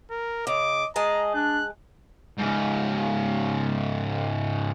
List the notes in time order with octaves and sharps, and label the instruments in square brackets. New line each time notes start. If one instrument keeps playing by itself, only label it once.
[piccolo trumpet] A#4
[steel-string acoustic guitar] C#3 [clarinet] D#5 [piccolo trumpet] D6
[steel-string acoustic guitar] G#3 G#4 A5 [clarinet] D#5 [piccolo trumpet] A#5
[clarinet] D4 [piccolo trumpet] F#6
[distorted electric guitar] G#2 C#3